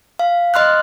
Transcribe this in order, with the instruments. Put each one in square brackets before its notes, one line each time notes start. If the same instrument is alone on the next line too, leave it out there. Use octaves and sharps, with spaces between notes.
[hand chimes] F5
D#5 C6 F6 F#6